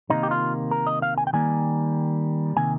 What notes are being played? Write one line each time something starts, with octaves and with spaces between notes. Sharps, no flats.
C3 D#3 A#3 D#4
G4
F4
A#4
D#5
F5
G#5
G5
D#3 G3 A#3 G#5
C3 D#3 A#3 G#5